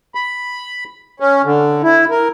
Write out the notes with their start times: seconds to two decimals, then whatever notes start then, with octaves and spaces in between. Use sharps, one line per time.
0.15 B5
1.20 C#4
1.45 D3
1.83 E4
2.10 A#4